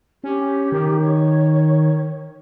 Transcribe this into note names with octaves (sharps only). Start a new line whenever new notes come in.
C#4 G4
D#3
C#5